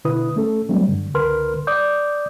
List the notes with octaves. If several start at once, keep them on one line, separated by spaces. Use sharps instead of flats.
B2 D3 E4 B4 D#6
A3 C#4 A4
F#3 G3 A3 C4 D4
G2 D3
C#2 D3 A#4 B4 C6 F6
D5 D6 D#6 G6